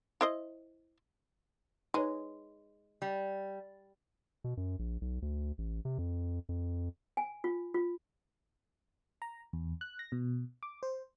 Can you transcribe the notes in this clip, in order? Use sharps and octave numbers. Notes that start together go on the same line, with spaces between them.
E4 C5 D#5
G#3 D#4 B4 C#5
G3
B2
F#2
A#1
B1
D2
A1
C3
F2
F2
G#5
F4
F4
A#5
E2
F#6
A#6
B2
D6
C5